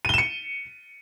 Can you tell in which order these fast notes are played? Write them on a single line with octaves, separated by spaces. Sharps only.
D#7 G7 E7 C#7